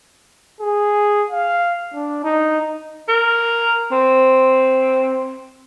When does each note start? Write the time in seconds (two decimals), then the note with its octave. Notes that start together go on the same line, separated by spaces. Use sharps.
0.61 G#4
1.30 F5
1.94 D4
2.24 D#4
3.09 A#4
3.92 C4